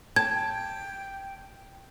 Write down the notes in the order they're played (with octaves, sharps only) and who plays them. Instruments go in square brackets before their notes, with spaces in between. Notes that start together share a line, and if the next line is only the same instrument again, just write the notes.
[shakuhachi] G5 [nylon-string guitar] A5 [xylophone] G#6